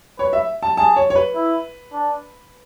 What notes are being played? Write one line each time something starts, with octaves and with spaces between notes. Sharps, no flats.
B4 C#5
E5
A5
G#4 A5
C#5
C#5
B4
E4
D4